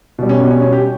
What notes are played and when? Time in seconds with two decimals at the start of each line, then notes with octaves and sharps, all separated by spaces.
0.19 B2 G3
0.29 C#4
0.40 B3
0.51 C#4
0.62 C#4
0.73 G4